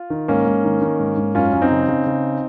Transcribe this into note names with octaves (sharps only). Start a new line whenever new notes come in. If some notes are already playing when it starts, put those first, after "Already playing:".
Already playing: F4
D#3
G#2 A#3 C#4
G#2
D#3
D#3
G#2
G#2
F#2 C#4 F4
F#2
C4 D#4
C#3
C#3
C#3